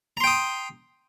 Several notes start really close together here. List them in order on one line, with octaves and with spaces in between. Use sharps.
A#5 C6 G5 D#6